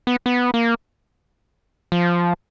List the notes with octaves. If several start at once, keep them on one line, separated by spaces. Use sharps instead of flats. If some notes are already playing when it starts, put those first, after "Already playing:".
B3
B3
A#3
F3